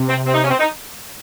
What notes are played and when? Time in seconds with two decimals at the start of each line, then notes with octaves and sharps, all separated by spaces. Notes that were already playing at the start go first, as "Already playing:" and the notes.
Already playing: C3
0.09 C4
0.26 C4
0.34 D#4
0.42 C#4
0.50 C4
0.59 D#4